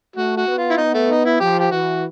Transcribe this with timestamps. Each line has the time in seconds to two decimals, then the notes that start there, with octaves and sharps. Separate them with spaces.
0.15 A3 F#4
0.37 F#4
0.46 B3
0.58 F4
0.70 E4
0.77 B3 D#4
0.94 A3
1.09 D#4
1.25 E4
1.40 F3 G4
1.60 G4
1.71 E3 F#4